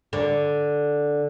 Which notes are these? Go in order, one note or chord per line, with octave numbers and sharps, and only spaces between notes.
D3